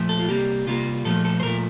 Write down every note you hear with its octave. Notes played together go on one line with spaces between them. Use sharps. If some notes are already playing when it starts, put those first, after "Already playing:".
Already playing: A#2 F3 A3
A4
F4
C3 G3 A#3 G4
C3 G3 A#3 F4
A#2 F3 A3 A4
A4
C5
A#2 F3 A3 A#4